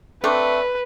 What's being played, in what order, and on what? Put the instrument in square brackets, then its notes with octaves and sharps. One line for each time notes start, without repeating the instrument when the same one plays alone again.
[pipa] A3 C4 D4 [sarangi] B4